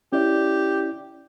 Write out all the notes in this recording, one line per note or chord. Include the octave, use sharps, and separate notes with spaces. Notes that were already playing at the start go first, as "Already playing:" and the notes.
C#4 E4 G4 D5